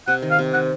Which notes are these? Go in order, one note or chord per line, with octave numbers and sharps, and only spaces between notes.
C3 F#5
D#3
F5
C3
D#3 F#5